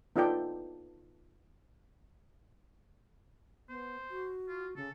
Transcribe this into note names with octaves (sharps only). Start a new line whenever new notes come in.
B3 D#4 F4 A4 D5 G5
B3 C5
F#4
F4
C#3 A4